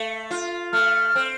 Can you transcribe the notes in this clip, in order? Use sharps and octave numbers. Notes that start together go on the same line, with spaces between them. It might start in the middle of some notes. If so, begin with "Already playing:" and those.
Already playing: A3
F4
A3 F6
C4